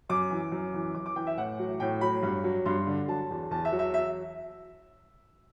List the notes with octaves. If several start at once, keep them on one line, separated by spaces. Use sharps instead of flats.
F#2 D6
E3
F#2
E3
F#2 D6
D6
E3 G5
E5
A2 F#5
F#3
A2 G5
F#3 B5
G2
F#3
G2 C6
D3
F#3 A5
E2
E2 A5
E5
F#3
E5
E5